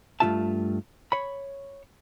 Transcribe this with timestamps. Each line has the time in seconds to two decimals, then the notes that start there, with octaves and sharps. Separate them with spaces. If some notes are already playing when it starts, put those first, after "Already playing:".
0.20 G2 G#3 A3 F4 E5 A5
1.12 C#5 B5